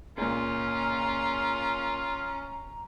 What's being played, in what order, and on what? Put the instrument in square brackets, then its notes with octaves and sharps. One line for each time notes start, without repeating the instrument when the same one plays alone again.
[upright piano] C#2 A#2 [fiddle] C#4 [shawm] F4 [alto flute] A#5